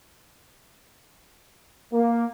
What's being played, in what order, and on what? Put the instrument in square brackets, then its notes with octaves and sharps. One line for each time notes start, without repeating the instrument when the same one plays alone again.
[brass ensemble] A#3